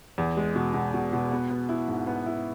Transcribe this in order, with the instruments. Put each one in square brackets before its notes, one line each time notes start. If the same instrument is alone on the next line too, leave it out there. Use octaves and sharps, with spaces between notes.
[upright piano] E2
G#3
B2
B2
B2
B2
B3
B3
E4
G#2
B3
E4